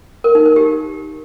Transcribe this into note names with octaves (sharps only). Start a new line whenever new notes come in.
A#4
D#4
A#4
G4